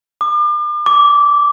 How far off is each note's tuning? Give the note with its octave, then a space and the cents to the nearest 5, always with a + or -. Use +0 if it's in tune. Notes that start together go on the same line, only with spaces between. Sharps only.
D6 +40
D6 -15